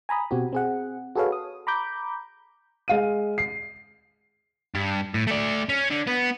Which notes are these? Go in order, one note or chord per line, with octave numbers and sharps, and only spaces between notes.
G#5 A#5 B5 D#6
B2 C4 F#4 G4
C4 G#4 F#5
F#4 G#4 A4 B4 C#5 F5
D#6
A#5 B5 D6 G6
G#3 F5 D#7
C7
G2
A2
A3 D5
C#4
D3
B3